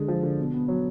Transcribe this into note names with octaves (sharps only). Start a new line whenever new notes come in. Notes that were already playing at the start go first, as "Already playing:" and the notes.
Already playing: D3 G#3
F3
D3
B2
B3
F#3